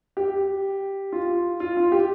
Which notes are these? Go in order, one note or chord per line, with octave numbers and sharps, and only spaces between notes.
G4
F4
F4
F4
G4